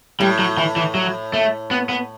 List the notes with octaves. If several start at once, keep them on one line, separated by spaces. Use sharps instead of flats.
A2 G3
F#3
E3
E3
F#3
A3
B3
B3